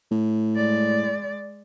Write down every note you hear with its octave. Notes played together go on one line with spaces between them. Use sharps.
A2
G#3 D5